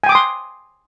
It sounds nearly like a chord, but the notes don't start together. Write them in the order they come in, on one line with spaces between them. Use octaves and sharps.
G#5 G5 D6 D#6 C6